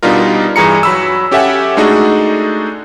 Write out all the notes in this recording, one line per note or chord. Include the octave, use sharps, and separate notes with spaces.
B2 G3 D4 D#4 F4 A#4
G2 E3 G#4 A#5 C#7
F#3 B5 E6
C#4 G4 A4 E5 F#5 G#5
G#3 A3 D4 D#4 F#4 G#4